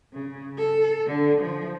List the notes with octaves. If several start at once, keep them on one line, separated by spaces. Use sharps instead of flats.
C#3
A4
D3
F3